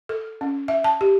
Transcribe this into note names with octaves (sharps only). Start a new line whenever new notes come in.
A4
C#4
E5
A5
G4